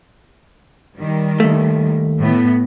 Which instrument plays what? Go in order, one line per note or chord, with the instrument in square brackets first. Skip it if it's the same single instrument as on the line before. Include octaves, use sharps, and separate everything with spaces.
[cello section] D#3 G3
[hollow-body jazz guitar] D#2 A3
[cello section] A2 B3